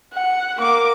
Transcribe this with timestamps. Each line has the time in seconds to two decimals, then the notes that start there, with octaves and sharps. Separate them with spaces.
0.13 F#5
0.58 A#3 D6